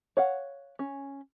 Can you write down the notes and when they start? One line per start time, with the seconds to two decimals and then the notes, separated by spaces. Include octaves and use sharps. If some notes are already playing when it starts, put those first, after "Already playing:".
0.17 C#5 F5 F#5
0.79 C#4